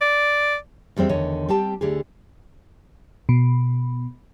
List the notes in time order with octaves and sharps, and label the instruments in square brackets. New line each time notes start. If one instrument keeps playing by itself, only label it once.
[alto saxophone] D5
[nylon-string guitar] E2 G3 G#3 C4 E5
E2 D3 D#3 C#5 D#5
G3 C4 G4 A5
D2 D3 G4 G#4
[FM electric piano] B2